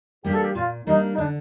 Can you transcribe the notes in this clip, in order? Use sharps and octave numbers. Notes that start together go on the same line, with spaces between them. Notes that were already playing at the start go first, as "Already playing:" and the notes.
G3 A#3 D4 G4
A4
G4
A#2 F4
G3 A#3 D4 D#4
D#4
D3 D4